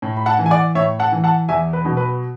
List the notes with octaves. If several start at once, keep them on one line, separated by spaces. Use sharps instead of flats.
A2
B5
F#5 A5
E3
G#5
D5 F#5
A2 C#5 E5
F#5 A5
E3
F#5 A5
E2 E5 G#5
B4
B2 F#3
B4